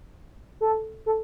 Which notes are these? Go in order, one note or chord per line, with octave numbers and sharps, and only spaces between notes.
A4
A4